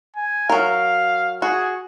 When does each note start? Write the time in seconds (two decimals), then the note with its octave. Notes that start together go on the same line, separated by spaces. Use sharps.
0.16 G#5
0.50 F#3 A#4 F5
1.42 F#4 G#4